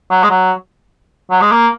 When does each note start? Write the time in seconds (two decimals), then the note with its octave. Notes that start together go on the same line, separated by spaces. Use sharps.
0.11 F#3
0.24 G#3
0.30 F#3
1.31 F#3
1.41 G#3
1.52 A#3